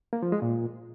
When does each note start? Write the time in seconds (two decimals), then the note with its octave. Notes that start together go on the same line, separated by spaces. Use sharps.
0.13 A#3
0.23 F3
0.32 G#3
0.42 A#2